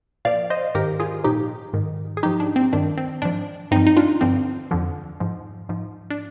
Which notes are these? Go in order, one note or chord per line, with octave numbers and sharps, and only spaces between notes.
A#2 F3 D5 F5
C5 D#5
G#2 D#3 G4 A#4
F4 G#4
A#2 F3 D#4 G4
G#2 D#3
G#4
G#2 F3 D#4 G4
D4
C4
G2 D#3 D4
C4
G#2 F3 D4
G2 F3 C4 D#4
D#4
D4 F4
G2 D3 F3 C4
F2 D3 F3
G#2 F3
G#2 F3
D4